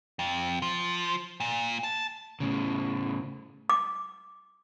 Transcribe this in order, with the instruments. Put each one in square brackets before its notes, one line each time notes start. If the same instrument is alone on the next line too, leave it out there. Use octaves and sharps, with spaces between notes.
[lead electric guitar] F2
F3
A#2
A5
[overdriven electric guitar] A2 C#3
[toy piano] D6